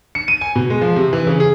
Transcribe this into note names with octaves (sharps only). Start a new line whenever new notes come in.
C#7
D#7
G#5
B2
G#3
F3
C3
E3
C#3
G#4